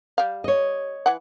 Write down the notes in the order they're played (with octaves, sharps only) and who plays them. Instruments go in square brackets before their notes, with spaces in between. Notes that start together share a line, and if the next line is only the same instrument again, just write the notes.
[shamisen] G3 F5
[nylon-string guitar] C#5 D#5
[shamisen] E3 F#5